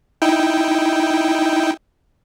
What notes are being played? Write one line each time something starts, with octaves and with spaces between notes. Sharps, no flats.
D#4 E4 G5